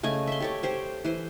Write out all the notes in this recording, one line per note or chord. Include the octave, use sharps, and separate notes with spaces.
C#3 A3 D#5 G#5
E5 C6
G4 A4 C#5
G4 C5 C#5
E3 C5